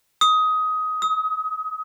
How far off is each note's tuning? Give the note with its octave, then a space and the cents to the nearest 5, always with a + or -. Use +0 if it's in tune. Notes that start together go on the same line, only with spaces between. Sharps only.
D#6 +15
D#6 +35